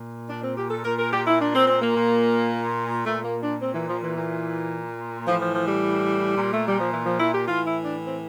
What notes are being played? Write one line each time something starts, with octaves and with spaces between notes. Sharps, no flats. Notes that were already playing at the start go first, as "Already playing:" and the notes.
Already playing: A#2
D4
C4
G4
A4
A#2 A#4
A#4
G4
E4
D4
C4
C4
A#3
A#2
A#2 A3
A#3
D4
C4
E3
F3
E3
A#2
A2 E3 F3
F3
F3
G3
A#2
A3
G3
F3
E3
F3
E4
G4
A2 E3 F4
E4
D4
C4